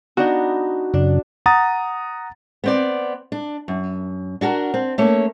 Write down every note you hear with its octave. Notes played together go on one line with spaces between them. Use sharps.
B3 D4 D#4 F#4
F#2 C#3 D4
F#5 A#5 D#6 A6
B3 C4 D5
D4
F#2
D4 F#4 A4 A#4
C4
A3 A#3 C#4 C#5